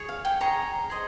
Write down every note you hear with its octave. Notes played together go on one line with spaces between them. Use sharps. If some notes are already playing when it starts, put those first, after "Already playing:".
Already playing: G#4 C#5
F5
G5
G#4 C#5 A#5
G#4 C5 D#5